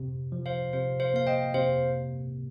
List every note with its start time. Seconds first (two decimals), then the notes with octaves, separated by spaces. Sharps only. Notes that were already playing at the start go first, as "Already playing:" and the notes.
Already playing: C3
0.32 F3
0.46 C5 F5
0.73 C3 C5 F5
1.00 C5 F5
1.14 A#3 F5
1.27 D#5 G5
1.54 C3 C5 F5